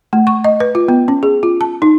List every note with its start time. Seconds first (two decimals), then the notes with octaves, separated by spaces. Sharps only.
0.13 A3
0.27 C#6
0.44 D#5
0.60 B4
0.75 F4
0.88 B3
1.08 C#4
1.23 G#4
1.43 F4
1.61 A5
1.82 D#4